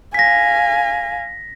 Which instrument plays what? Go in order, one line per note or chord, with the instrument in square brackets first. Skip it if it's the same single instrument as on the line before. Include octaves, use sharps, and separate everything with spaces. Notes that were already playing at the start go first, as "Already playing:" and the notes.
[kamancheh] F5 G#5 [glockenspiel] A#6 B6